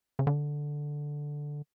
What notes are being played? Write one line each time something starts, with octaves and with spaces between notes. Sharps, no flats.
C#3
D3